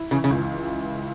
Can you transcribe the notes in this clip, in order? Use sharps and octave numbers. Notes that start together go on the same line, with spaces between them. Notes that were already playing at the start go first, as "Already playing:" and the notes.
Already playing: E4
C#3 E3
C#3
C#2